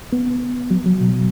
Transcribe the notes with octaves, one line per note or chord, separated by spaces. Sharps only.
B3
F#3
F#3
B2